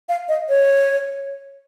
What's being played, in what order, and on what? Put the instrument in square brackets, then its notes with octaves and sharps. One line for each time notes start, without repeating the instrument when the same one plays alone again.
[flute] F5
D#5
C#5